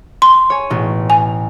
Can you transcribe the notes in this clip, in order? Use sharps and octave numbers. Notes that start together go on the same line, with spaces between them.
C6
C#5 G#5
A1 B2
G#5